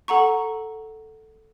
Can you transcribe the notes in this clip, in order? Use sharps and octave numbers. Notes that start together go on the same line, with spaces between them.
A4 F#5 A#5 C#6